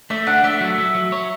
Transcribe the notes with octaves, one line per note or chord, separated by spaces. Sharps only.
A3 E5
D4 F#5
A3 E5
F#3
F#3
F#3
C#5